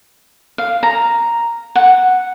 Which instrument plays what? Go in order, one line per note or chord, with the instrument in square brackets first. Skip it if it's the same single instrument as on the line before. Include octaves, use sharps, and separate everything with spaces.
[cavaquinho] F5
A#5
F#5